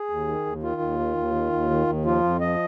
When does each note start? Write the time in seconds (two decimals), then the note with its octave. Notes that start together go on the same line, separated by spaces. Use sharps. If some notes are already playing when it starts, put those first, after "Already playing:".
Already playing: G#4
0.10 D#2
0.27 D#3
0.46 D#2
0.63 D#3 F4
0.81 D#2
0.99 D#3
1.17 D#2
1.35 D#3
1.53 D#2
1.70 D#3
1.87 D#2
2.05 F3 F4
2.24 F2
2.41 F3 D#5